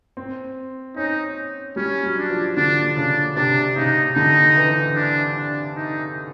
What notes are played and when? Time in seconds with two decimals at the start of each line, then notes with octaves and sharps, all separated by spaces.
0.17 C4
0.96 C#4 D#4
1.76 G3 C#4
2.04 F#3
2.17 D4
2.30 F3
2.56 D3 D4
2.96 C#3 D4
3.36 C3 D4
3.76 C#3 D#4
4.15 D3 D#4
4.56 E3
4.95 D4
5.36 D4
5.76 D#4